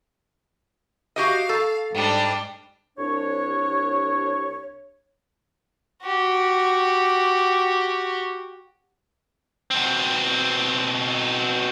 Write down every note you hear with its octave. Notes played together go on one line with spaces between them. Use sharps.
F#4 G4 D#5 F5
A4
G#2 G3 D4
C2 D4 C#5
F#4 G4
B2 C4